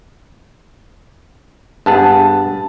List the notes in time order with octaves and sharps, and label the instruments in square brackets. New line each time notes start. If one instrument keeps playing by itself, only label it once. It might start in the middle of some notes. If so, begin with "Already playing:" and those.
[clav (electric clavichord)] G2 B3 G#4 [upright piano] A5